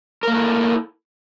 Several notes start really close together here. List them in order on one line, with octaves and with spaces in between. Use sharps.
A#4 A#3 A4 E4